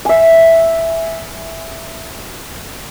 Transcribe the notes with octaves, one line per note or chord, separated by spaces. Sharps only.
E5 G#5